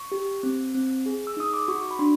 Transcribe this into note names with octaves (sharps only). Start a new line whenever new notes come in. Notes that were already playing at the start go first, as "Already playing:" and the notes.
Already playing: C#6
G4
C4
C4
G#4
E6
D#4 D#6
D6
F#4 C#6
B5
D4 C6